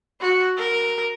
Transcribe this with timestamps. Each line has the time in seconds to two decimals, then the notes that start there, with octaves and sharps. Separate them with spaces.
0.20 F#4
0.57 A#4